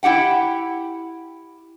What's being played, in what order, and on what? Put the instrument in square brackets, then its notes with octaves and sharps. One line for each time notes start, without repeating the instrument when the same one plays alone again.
[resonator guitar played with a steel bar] E4 G4 F#5 G5